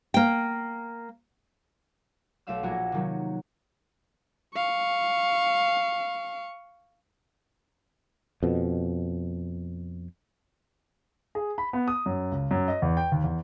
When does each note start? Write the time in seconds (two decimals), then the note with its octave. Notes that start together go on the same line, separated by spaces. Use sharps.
0.14 A#3 G5
2.47 B1 A3 E5 F5 E6
2.63 A#1 F#3 F#4 A#4 G#6
2.92 C3 D#3 F#3
4.55 F5 C#6
8.43 F2 B2
11.35 G#4
11.58 B5
11.73 B3
11.88 D#6
12.06 F#2
12.32 C#2
12.51 F#2
12.68 D#5
12.82 E2
12.97 G5
13.12 D#2
13.24 E2